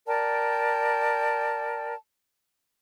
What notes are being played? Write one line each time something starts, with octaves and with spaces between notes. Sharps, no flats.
A#4 D5 G5 A5